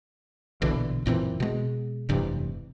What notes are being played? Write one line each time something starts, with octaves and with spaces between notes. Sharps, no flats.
A#1 B2 D3 E3
F#1 A#2 E3 C4
B2 G#3
F1 G2 C3 E3